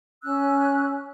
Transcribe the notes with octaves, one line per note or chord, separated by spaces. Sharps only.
C#4 E6 F#6